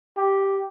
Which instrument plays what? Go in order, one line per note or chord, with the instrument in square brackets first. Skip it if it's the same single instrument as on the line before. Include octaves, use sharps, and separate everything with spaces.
[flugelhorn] G4